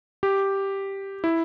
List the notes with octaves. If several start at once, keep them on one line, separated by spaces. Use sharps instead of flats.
G4
E4